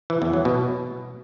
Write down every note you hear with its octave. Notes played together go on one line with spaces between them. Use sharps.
E3
E2
F#3
B2